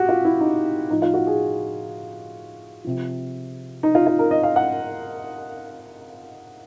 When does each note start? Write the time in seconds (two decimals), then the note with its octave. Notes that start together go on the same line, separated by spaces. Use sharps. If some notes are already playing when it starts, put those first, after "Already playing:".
Already playing: A2 F#4 G4
0.09 F4
0.25 E4
0.41 D#4
0.90 A2 F3 D#4
1.02 F4
1.14 F#4
1.27 G#4
2.85 C3 F3
3.83 D#4
3.95 F4
4.07 F4
4.19 A#4
4.31 D#5
4.43 F5
4.56 F#5